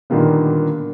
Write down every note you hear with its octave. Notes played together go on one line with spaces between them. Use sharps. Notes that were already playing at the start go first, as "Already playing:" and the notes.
A#2 D3 D#3 G3 A#3 B3